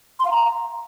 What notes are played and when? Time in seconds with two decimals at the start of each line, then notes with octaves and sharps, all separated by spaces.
0.19 C6
0.25 F5
0.31 A#5